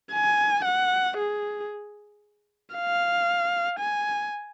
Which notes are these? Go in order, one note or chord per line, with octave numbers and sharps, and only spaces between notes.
G#5
F#5
G#4
F5
G#5